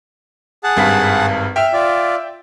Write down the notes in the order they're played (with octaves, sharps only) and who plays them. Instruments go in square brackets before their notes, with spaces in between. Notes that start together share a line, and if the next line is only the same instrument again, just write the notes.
[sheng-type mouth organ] G#4 F#5 A5
[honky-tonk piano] G#1 G2 B6
[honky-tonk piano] E5 G5 [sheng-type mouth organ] F6
[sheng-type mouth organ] F4 D5